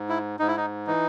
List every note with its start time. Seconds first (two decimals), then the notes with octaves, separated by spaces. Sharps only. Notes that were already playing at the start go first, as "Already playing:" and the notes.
Already playing: G#2
0.09 E4
0.39 G#2 D#4
0.48 E4
0.57 D#4
0.87 E3 D#4